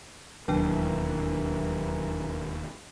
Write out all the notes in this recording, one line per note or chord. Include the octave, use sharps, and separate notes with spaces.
E1 D#2 E3 F#3 D4 A#4 G5